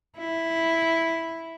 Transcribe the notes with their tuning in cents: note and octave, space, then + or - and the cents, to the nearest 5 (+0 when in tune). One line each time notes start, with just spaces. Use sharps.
E4 -5